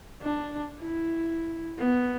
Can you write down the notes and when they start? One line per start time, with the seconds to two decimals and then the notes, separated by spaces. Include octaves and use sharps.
0.22 D4
0.81 E4
1.78 B3